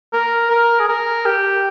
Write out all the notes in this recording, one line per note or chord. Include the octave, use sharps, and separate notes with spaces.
A#4
A#4
G#4
A#4
G4